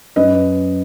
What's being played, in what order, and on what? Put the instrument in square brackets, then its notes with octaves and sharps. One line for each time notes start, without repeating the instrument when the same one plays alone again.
[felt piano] F#2 B4 D#5